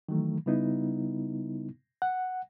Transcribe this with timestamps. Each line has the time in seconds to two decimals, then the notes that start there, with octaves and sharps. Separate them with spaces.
0.09 D#3 E3 F#3 A3
0.46 C#3 G3 B3 D#4 E4
2.02 F#5